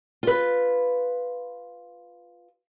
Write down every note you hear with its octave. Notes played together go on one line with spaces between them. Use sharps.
F4 B4